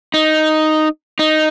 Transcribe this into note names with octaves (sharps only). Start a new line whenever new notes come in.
D#4
D#4